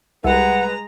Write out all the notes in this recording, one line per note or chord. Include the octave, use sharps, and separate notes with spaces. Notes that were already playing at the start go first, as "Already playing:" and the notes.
C2 G#3 B4 F#5 A#5